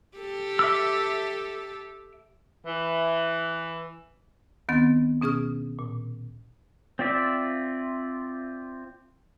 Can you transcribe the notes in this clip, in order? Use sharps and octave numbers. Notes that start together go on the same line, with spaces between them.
G4 A4
E5 D6 E6
E3
D2 D#3 B3 C4 A6
B2 C#4 G#4 D#6 F6
A#2
C4 F4 D5 E5